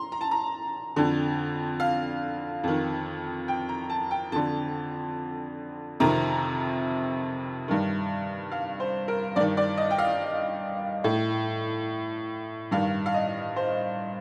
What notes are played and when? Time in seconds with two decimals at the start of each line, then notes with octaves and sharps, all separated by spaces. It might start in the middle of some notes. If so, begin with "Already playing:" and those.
Already playing: A#5 C6
0.12 A#5
0.21 A5
0.31 A#5
0.96 F2 D3
1.80 F5
2.64 F2 D#3
3.48 G5
3.69 A#5
3.90 A5
4.11 G5
4.32 F2 D3 A5
6.00 F2 C3 D#3 A#5
7.68 G2 D#3
8.52 F5
8.80 C5
9.08 A#4
9.36 G2 D#3 D5
9.57 D5
9.77 D#5
9.91 G5
9.98 F5
11.04 A2
12.71 G2 D#3 F5
13.06 F5
13.14 D#5
13.56 C5